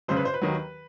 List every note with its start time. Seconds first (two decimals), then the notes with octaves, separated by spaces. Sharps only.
0.08 G1 F#2 C#3 C5
0.17 B4
0.25 C5
0.34 B4
0.41 D#2 D#3 F#3